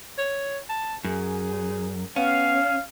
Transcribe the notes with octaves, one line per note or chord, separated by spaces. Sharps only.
C#5
A5
F#2 G#4
B3 C#4 F5